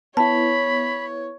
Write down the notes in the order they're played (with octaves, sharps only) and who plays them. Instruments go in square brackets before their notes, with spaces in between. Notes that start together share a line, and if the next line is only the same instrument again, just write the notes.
[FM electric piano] B3 E4 [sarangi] C#5 [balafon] A5 [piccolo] B5